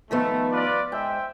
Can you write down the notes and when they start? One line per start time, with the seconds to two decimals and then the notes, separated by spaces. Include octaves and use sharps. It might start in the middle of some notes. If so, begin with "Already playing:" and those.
0.11 D#3 F3 A3 B3
0.51 F4 B4 D5
0.92 G#2 C5 E5 G5